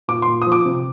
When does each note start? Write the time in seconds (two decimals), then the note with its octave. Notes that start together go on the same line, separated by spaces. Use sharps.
0.08 A#2 D6
0.22 C6
0.27 A#2
0.42 D#6
0.46 F3
0.52 D6
0.65 C3